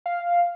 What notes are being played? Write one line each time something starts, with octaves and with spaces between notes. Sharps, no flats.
F5